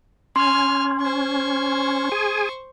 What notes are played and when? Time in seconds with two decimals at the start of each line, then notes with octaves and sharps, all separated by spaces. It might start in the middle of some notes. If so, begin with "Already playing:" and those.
0.36 C#4 G#5 C6 F6
1.01 C5 C#6
2.12 G#4 G#5